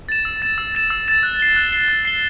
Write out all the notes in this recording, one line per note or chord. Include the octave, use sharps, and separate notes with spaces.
A6 E7
E6
A6 E7
E6
A6 E7
E6
A6 E7
F#6
C7 G7
F#6
C7 G7
F#6
C7 G7